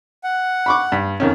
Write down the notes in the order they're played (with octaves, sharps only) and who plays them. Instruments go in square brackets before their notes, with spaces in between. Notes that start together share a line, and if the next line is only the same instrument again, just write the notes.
[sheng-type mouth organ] F#5
[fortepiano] B5 C#6 D6
G2
F2 D#3 C#4